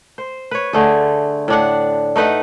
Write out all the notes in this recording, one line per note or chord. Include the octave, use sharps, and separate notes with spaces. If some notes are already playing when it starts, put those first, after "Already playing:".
C5
B4 C#5
D3 A3 G#4
A2 D4 F#5
A3 D#4 B4 F#5